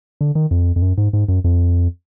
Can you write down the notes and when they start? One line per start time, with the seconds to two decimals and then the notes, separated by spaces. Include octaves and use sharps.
0.21 D3
0.35 D#3
0.51 F2
0.76 F2
0.82 F#2
0.98 G#2
1.13 G#2
1.28 F#2
1.44 F2